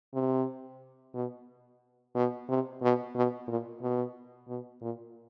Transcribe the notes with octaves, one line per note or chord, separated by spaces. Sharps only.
C3
B2
B2
C3
B2
B2
A#2
B2
B2
A#2